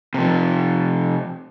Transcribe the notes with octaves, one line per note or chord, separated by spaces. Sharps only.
C3 F3